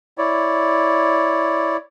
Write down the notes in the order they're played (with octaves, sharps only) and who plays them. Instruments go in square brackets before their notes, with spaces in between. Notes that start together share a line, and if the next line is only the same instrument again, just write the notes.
[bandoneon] E4 C#5 D5